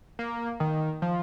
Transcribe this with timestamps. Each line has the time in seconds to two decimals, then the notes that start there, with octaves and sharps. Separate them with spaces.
0.19 A#3
0.60 D#3
1.02 F3